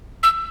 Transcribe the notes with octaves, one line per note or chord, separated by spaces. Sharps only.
E6